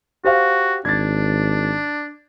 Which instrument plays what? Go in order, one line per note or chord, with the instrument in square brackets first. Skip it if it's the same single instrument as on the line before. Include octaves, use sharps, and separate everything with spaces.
[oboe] F#4 [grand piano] G4 C5 F5
[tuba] G#1 [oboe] D4 [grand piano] G#6 A6